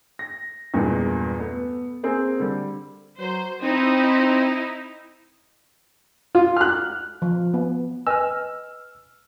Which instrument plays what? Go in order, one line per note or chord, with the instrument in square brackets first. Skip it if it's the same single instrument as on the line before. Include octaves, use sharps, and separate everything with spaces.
[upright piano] A#6
E2 G2 A#2 G#3
A3 B3
A#3 C4 G#4
D3 G3
[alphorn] F#3 [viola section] C5
[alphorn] C4 [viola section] D#4 E4
[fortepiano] F4
F6 F#6
[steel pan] F3
B3
[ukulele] B4 D#5 G#5 [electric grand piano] E6 F6